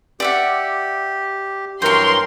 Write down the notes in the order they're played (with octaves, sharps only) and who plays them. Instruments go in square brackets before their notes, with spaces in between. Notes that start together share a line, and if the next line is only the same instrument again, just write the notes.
[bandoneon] G4 [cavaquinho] D5 E5 F#5
[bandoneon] G2 E3 F#3 [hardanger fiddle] A#4 [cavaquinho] C#5 G5 [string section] C6